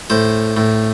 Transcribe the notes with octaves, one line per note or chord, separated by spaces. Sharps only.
A2 C5
A2